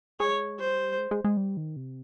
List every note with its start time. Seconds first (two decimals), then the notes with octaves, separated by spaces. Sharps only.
0.20 G#3 C#5
0.59 G3 C5
0.98 G#3
1.11 G#3
1.24 G#3
1.37 G3
1.57 D#3
1.76 C3